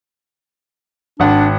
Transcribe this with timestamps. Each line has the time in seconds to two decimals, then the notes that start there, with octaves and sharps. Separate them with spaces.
1.20 G#1 D4 F#5